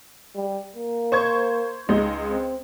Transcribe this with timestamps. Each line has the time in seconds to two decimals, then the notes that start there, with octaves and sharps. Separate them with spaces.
0.36 G3
0.76 A#3
1.12 C5 C#6 G#6
1.89 C#2 G#3 D#4 D#5
2.30 C4